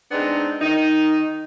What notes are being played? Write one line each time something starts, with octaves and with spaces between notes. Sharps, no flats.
G#3 B3 C4 D4 D#4
D#3 D#4